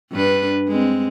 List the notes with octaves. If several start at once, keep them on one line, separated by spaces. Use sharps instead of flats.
G2 D4 B4
G#3 C4